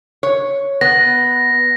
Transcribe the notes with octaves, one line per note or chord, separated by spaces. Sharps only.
C#5
B3 A#6